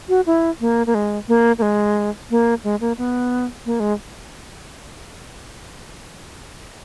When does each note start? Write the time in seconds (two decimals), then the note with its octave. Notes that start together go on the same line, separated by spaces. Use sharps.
0.09 F#4
0.27 E4
0.61 A#3
0.87 A#3
0.95 G#3
1.28 A#3
1.58 A#3
1.62 G#3
2.30 A#3
2.64 G#3
2.81 A#3
2.98 B3
3.66 A#3
3.80 G#3